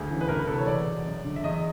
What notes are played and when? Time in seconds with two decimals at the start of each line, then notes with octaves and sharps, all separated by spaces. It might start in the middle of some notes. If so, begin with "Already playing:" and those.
Already playing: D2 G#4
0.09 C#3 E3
0.21 B4
0.28 D2 A#4
0.38 B4
0.48 C3 E3 A4
0.58 C#5
0.67 E2 D5
0.87 B2
1.06 F#2
1.24 D3
1.36 E5
1.44 E2 D#5